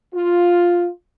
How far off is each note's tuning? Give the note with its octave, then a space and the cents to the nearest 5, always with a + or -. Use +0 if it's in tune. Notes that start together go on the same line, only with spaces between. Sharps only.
F4 +5